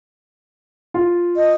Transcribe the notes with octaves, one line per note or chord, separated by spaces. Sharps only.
F4
D#5